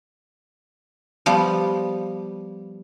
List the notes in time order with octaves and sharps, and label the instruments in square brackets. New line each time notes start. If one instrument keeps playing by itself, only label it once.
[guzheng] F3 G3 B3